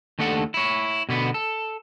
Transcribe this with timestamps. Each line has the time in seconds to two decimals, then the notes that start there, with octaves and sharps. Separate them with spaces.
0.19 D#2 A3 D4 A4 F#5
0.54 E4 C#5
1.09 B2 D3 B3
1.34 A4